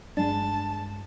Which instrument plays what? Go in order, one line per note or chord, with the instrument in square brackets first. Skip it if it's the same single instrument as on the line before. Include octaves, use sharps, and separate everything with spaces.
[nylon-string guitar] G2 G#3 [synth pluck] D4 [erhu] A5